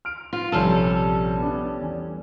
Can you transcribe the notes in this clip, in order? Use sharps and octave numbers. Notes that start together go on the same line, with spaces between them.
F6 D7
F4
A#1 C3 G3 C#4 A4 F6
B3 D4
E2 G#5